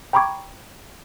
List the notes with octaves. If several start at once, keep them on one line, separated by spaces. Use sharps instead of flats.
G5 A#5 B5 C#6 D6 G#6